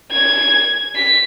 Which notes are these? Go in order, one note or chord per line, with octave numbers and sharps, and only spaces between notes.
G#6
B6